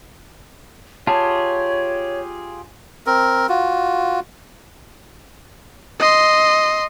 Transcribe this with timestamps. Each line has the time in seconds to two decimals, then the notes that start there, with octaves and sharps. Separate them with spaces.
1.07 F4 G4 G#4 C#5 A5
3.07 C4 A#4
3.49 F4 F#4
6.00 D#5 C6